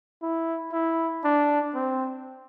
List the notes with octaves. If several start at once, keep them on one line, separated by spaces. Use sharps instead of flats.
E4
E4
D4
C4